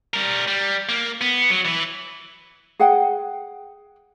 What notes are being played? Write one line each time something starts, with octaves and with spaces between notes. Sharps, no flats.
G3 A#4
G3
A#3
B3
F#3
E3 E4
G#4 F#5 G5